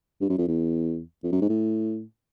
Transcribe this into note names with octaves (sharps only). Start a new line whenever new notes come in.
G2
F#2
F2
E2
F2
F#2
G#2
A2